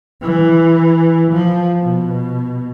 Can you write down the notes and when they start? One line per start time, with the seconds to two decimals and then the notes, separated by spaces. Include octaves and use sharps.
0.23 E3
1.32 F3
1.83 B2